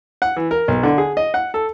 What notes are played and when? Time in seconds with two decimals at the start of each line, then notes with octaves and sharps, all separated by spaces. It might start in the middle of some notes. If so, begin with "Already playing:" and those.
0.22 F#5
0.37 E3
0.51 A#4
0.68 B1
0.83 D3
0.98 G#4
1.17 D#5
1.34 F#5
1.54 A4